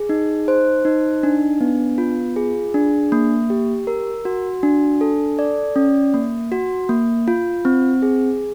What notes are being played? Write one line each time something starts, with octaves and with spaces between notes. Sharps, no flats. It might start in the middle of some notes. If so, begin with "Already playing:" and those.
Already playing: G#4
D#4
C5
D#4
D4
B3
F4
G#4
D4
A#3
G4
A#4
F#4
D4
A4
D5
C#4
A#3
F#4
A#3
F4
C4
G#4